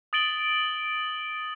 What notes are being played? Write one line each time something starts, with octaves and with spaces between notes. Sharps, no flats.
D#6 A6 D7 F#7 G7